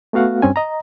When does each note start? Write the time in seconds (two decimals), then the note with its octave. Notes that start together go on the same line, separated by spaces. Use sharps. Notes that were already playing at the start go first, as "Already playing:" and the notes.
0.13 A3 B3 F#4 F5 F#5
0.42 G2 C4 C#4 G#5
0.56 D#5 A#5